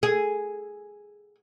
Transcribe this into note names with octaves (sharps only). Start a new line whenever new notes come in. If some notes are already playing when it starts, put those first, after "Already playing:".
G#4